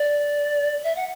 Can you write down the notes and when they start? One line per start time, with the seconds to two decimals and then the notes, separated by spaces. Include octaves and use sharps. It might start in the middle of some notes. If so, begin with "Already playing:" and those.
Already playing: D5
0.84 E5
0.96 F#5